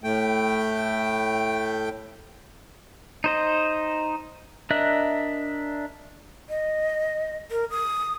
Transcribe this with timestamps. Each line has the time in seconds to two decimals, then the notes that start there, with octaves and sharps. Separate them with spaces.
0.04 A2 A3 G5
3.24 D#4 C5 D#5
4.70 D4 A#4 D#5 E5 F#6
6.49 D#5
7.51 A#4
7.70 D#6